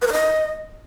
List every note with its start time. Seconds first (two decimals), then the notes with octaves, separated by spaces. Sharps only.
0.02 B4
0.07 A#4
0.12 D#5